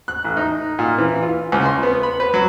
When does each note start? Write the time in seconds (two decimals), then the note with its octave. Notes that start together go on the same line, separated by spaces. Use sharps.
0.08 F#6
0.24 A1
0.37 D#4
0.79 A#2
0.98 E3
1.22 F4
1.52 C#2
1.65 C6
1.83 B3
2.03 B5
2.20 B4
2.34 F#3